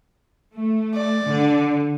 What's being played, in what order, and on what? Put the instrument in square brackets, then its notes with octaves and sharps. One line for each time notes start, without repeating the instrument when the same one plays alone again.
[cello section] A3
[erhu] D5
[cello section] D3